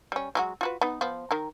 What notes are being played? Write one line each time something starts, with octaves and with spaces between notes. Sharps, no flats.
G3 C#4
F#3 G#3 F#4
F4 F#4 B4
B3 D#4
F3 B3
D#3 A#4